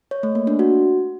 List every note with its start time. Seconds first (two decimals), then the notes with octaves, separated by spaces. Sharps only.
0.11 C#5
0.23 A3
0.35 A#3
0.47 D4
0.59 F#4